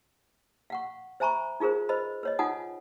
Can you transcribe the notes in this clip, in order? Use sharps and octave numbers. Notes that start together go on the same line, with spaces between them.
F5 F#5 C#6
C5 E5 G#5 A#5 B5 C#6
D#4 F4 G#4 A#4 C5
B4 C5 D#5 B5
B4 C#5 D#5
D#4 F4 F#5 G#5 D#6